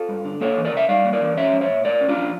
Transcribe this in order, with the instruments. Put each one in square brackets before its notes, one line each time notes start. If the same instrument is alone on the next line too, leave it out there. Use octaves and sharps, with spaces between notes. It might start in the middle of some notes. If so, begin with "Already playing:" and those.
Already playing: [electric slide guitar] F4 A4
G2
D3
A#3 A4 C#5
E3
A#4 D5
C#3 E5
G3 D5 F5
A#3
A#4 D5
E3
C#4 C#5 E5
F3
C#5 E5
A#2
A3 A#4 D5
C#4
D4 F4
F3